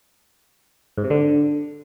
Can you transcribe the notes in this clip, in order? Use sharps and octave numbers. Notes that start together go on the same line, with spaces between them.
G#2
C3
D3